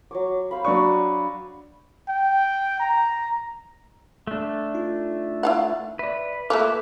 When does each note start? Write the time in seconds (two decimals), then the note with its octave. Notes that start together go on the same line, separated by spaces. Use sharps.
0.11 F#3 C#5 D6
0.51 C5 F5 B5
0.65 F#3 D4 C#6
2.09 G5
2.80 A#5
4.27 A3 D4
4.75 D#4 F4
5.43 E4 F5 F#5
5.99 B4 D5 E5
6.50 A3 A#3 E4 F4 A4 B4 D6